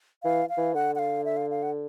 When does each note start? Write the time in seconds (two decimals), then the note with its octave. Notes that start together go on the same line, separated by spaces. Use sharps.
0.23 E3 F5
0.49 F5
0.57 E3
0.74 D3 F#5
0.95 F#5
0.99 F5
1.25 E5
1.37 F5
1.50 F5
1.63 F#5